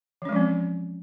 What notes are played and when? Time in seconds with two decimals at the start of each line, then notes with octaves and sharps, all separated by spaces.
0.22 E3
0.25 C#4
0.29 G#3
0.32 F3
0.36 C4